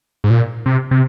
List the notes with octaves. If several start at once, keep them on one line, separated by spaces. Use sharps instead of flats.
G#2
A#2
C3
C3